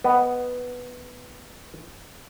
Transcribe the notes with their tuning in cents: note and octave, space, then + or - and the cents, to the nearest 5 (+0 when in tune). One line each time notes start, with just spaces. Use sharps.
B3 +0 D#5 +0